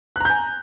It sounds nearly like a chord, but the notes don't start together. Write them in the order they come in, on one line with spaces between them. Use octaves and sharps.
F#6 A#5 G6 G#5